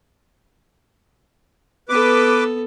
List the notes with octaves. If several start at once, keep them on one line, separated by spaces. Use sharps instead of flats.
B3 A4 B4 D6